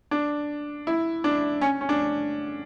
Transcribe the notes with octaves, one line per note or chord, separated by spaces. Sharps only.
D4
E4
D4
C#4
C#4
D4